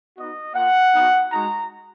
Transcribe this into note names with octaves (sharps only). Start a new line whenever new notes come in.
B3 D#4 F#4 D#5
A#3 F4 F#5
B3 D#4 F#4
G#3 D#4 F#4 A#5